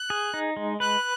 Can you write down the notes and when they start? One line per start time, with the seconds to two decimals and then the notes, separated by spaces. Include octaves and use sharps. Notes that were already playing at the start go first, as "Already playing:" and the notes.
Already playing: F#6
0.10 G#4
0.34 D#4
0.57 G#3
0.80 B4 F#6